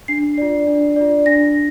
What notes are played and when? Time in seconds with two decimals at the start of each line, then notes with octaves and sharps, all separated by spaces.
0.08 D4 C7
0.38 F4 D5
0.67 D4
0.96 F4 D5
1.26 D4 A#6